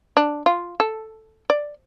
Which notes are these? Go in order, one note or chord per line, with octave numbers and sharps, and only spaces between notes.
D4
F4
A4
D5